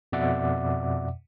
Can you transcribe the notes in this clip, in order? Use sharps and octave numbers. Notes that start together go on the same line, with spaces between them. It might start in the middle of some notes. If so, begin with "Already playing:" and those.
F2 B2 D5 E5 F#5 D6